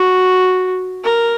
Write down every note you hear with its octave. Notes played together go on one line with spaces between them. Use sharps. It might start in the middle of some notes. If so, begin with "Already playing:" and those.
Already playing: F#4
A#4